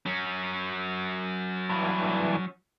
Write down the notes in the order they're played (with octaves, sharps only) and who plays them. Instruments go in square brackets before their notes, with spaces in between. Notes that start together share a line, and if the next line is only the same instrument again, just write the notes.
[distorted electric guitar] F#3 C#4
[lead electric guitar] G2 E3